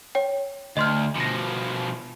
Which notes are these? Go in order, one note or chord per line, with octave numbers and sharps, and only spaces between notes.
C#5 G5
D2 D#5 C6 F6
B2 F3 A#6 C#7